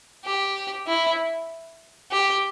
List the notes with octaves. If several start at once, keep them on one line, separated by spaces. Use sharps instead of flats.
G4
E4
G4